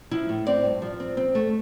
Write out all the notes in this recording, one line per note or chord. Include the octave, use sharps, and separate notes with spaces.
F3 E4
A2
C4 D5
G2
F3
C4
C4
A3